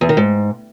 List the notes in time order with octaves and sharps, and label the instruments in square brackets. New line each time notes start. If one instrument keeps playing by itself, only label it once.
[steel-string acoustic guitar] E2
D#3
G#2